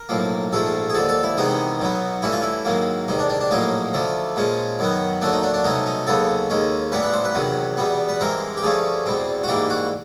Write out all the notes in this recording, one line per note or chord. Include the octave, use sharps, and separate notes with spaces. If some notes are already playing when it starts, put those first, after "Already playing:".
Already playing: A#4
B1 A2 F3 A#3
A#1 G#2 F3 A3 A4
G#4
D#2 D3 F3 A4
A4
E4
E2 C3 D#3 G#3 B3 D#4
B1 B2 F#3 B3
G2 E3 A3 C#4 E4
F4
E4
G#2 D#3 F#3 A#3
E2 C3 D#3 D#4
D4
D4
D4
A#1 A2 F#3 A#3 C#4 D#4
D2 D3 F3 A3
A#2 F3 G#3 C#4
F#2 D#3 F#3 B3
D#2 D3 F#3 A3 D4
D#4
D4
D4
C2 B2 F#3 A3 C#4 D#4
D#4
D#2 C#3 F#3 B3 A4
D#2 D#3 G#3 C#4
A1 G2 E3 G3 B3 B4
B4
C5
B4
E2 C3 D#3 F#3
E2 B2 G3 B3
B4
G2 E3 G#3 C4 A#4
G4
G2 D3 F3 A3 C#4 G#4
E2 B2 G3 C4
F#4
G#2 E3 G3 A#3 G4
F#4